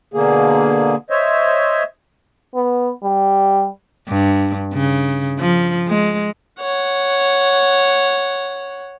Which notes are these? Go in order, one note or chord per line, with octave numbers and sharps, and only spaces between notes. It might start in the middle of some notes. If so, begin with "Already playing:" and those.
B2 D3 A#3 G#4
C5 C#5 D#5 E5
B3
G3
G2
C#3
F3
G#3
C#5 F#5